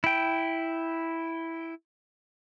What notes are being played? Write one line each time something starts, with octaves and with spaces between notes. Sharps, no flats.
E4 G5